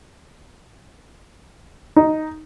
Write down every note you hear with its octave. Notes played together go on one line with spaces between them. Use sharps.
D#4